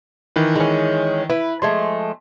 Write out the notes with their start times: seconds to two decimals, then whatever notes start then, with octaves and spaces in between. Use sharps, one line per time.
0.36 D#3 E3 B4
0.56 G#3 C#4
1.30 E4 B4
1.62 F3 G#3 A3 C6